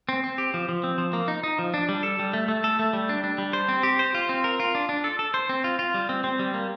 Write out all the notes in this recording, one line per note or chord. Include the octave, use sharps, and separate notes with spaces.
C4
C4
G4
F3
F3
C4
F3
A#3
D#4
D#4
F3
D4
G3
A4
G3
A3
A3
A4
A3
G3
D4
D4
G3
C5
C4
G4
C5
F4
C4
A#4
F4
D4
D4
A4
A4
C5
C4
F4
F4
G3
C4
C4
G3
A#3